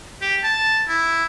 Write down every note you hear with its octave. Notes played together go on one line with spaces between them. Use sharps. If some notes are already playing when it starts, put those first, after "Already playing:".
G4
A5
E4